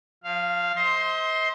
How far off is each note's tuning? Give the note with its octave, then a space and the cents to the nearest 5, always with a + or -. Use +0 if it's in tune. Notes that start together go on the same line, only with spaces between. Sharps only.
F3 +25 F5 -10
C5 +0 D#5 +40 C6 +10